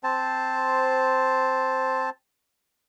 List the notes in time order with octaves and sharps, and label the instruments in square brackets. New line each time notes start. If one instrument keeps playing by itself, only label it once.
[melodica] C4 C5 A5